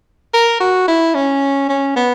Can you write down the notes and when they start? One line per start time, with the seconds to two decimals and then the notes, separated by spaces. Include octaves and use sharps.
0.34 A#4
0.60 F#4
0.88 E4
1.15 C#4
1.69 C#4
1.96 B3